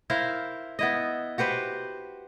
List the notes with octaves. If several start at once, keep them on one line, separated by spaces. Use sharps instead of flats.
E4 A#4 C5 F5
B3 E4 D#5
F#4 G4 B4 C5